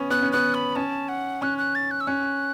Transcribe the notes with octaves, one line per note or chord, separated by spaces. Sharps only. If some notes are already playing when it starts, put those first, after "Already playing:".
Already playing: B3 C#4
B3 F#6
C#4
B3 F#6
B5
C#4 A5
F#5
C#4 F#6
F#6
A6
F#6
E6
C#4 F#6